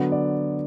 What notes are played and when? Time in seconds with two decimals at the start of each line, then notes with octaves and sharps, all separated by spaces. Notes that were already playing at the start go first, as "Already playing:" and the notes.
Already playing: D3 F#3 B3
0.12 D5